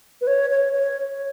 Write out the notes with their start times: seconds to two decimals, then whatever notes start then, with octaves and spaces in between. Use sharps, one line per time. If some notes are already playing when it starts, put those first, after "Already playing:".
0.21 B4
0.27 C#5
0.50 C#5
0.73 C#5